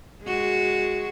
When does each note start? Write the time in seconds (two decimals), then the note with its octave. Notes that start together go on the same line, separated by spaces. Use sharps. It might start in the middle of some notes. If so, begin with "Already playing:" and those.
0.23 G#3 F#4